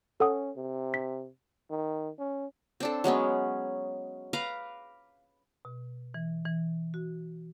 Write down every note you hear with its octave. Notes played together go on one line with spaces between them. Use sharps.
C#4 A4 F#5 D#6
C3
B6
D#3
C#4
C4 D4 A4
F#3 G#3 B3 C#4
B4 F5 A#5 D6
B2
E3
E3
F#4